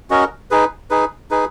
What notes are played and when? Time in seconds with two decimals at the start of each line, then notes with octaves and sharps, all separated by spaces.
0.10 C#4 F#4 A#4 D#5
0.51 D#4 G#4 B4
0.90 D#4 G#4 B4
1.31 D#4 G#4 B4